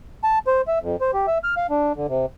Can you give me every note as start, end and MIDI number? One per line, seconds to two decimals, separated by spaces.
0.24 0.39 81
0.47 0.62 72
0.68 0.79 76
0.82 0.96 41
1.01 1.11 72
1.14 1.26 67
1.27 1.38 76
1.44 1.55 89
1.57 1.67 77
1.70 1.92 62
1.96 2.07 50
2.08 2.26 48